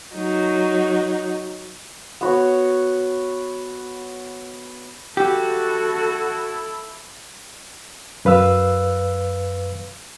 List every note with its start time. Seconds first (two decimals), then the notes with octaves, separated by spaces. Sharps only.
0.14 F#3 D#4
2.21 B3 F#4 C#5
5.17 E4 F#4 G4 A4
8.25 F#2 B4 F5 E6